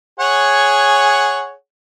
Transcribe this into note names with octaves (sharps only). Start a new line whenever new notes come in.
G#4 C#5 F#5